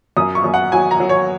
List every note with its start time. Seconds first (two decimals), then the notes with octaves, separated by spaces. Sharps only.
0.17 F#2 D#6
0.35 C#6
0.44 F#2
0.54 F#5
0.72 F#3 G#5
0.91 A#5
1.00 F#3
1.09 C#5